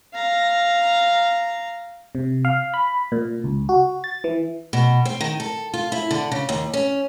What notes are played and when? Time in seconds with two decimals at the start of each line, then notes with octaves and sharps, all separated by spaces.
0.14 F5 A#5
2.15 C3
2.45 F5
2.74 B5
3.12 A#2
3.44 C#2
3.69 F#4
4.04 A6
4.24 E3
4.73 B2
5.05 C4
5.21 D#3
5.40 A4
5.73 F4
5.92 E4
6.11 D3
6.32 C#3
6.49 D#2
6.73 C#4